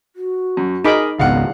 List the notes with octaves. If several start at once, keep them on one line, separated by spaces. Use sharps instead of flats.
F#4
F#2
D#4 G#4 A#4 D#5 B5 D6
G#1 C#2 B3 F5 F#5